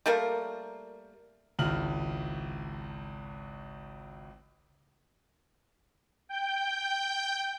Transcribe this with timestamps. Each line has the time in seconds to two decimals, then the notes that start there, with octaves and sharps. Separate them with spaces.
0.06 G3 A3 A#3 A#4
1.59 G#1 C#2 E4 F6 F#7
6.29 G5 G6